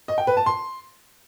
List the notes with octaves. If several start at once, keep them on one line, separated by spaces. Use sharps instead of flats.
D#5
G5
B4
A5
C6